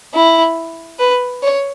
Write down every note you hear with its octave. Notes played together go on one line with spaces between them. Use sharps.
E4
B4
C#5